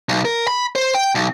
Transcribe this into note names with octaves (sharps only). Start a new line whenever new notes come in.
B1
A#4
B5
C5
G5
B1